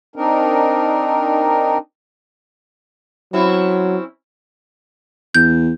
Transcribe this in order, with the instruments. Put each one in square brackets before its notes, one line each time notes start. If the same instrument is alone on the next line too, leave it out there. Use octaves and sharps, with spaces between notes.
[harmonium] C4 D4 D#4 A#4
[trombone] F#3 [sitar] C4 C#4 E4
[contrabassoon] E2 [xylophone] G6